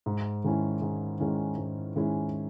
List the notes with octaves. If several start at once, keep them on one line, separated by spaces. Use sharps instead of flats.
G#2
D#3 G#3 C#4 E4
G#2
D#3 G#3 C#4 E4
G#2
D#3 G#3 C#4 E4